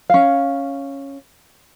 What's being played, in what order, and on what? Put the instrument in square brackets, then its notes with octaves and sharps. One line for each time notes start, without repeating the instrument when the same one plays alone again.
[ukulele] C#4 F5